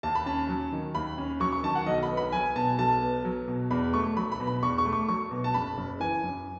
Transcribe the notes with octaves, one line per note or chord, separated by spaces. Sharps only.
D#2 A5
B5
C#4 A5
F#3
D#3
D#2 B5
C#4
F#3 C#6
C#6
D#3 A5
F#5
B1 D#5
B5
B3
B5
F#3 G#5
B2 A5
B1 A5
B3
F#3
B2
E2 B5
A3 C#6
F#3 B5
B5
B2
B5
E2 C#6
C#6
A3
C#6
F#3 C#6
B2
A5
F#1 B5
F#1
E3 G#5
F#2